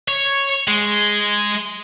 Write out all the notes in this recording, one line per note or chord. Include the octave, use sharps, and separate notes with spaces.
C#5
G#3